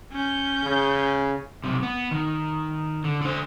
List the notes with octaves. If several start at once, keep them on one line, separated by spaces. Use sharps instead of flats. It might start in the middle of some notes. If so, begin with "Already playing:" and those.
C#4 G6
C#3
B1 C3
B3
D#3
D3
D3 C5